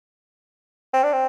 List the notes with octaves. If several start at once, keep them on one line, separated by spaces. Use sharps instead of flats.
C4
D4
C4